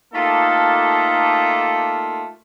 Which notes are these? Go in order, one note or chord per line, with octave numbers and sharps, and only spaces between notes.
A3 A#3 D#4 F4 G4 A4